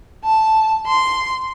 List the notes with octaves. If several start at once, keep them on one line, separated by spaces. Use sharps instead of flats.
A5
C6